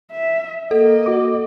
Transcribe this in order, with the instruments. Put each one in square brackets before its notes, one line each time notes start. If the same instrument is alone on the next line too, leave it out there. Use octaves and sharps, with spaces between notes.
[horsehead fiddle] E5
[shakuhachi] A#3 [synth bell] A4 [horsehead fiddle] D#5
[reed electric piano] F#4 D6